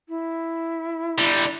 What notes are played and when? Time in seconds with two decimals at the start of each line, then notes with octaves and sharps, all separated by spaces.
0.09 E4
1.18 D3 G3